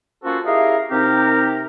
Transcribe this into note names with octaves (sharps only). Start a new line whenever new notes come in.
A#3 C#4 F4 F#4 A4 C5
E4 G4 G#4 A#4 D#5 F5
C3 C4 D#4 G4 A#4